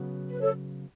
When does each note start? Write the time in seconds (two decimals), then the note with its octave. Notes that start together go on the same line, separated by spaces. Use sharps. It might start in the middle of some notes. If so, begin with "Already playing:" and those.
Already playing: C#3 F#3 B3
0.28 B4
0.40 A4 C#5